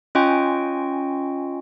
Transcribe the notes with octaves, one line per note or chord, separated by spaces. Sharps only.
C#4 F4 D#5 G5 G#5 C#6